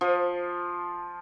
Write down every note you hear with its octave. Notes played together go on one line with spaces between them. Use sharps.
F3